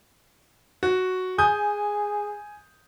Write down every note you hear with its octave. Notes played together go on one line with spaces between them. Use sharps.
F#4
G#4 G#5 D#6 G6